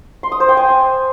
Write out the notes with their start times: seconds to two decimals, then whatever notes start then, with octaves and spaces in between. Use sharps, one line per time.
0.23 C6
0.32 D#6
0.40 C5
0.49 G5
0.57 G#5